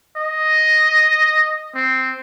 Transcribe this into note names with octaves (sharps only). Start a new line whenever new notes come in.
D#5
C4